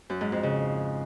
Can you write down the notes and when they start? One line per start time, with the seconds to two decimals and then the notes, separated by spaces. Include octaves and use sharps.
0.10 F#2
0.21 G#2
0.32 F2
0.43 C#3